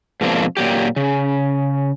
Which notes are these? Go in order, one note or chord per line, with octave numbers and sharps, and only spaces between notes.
G#2 B2 F3 A#3 C4 D4
A#2 F#3 G4
C#3